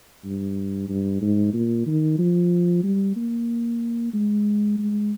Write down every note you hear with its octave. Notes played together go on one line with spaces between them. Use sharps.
G2
G2
G#2
A#2
D#3
F3
G3
A#3
G#3
G#3